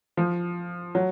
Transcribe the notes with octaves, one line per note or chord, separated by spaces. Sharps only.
F3
F#3